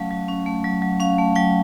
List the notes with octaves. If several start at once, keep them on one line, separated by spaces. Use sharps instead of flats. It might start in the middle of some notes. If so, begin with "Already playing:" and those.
Already playing: F#3 A3 C#4 F5
F#3
C#4
A3
F#3
F#3
C#4 F5
A3
F#3 G5